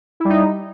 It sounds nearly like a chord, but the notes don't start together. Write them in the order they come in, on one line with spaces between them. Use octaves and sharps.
E4 G3 D#4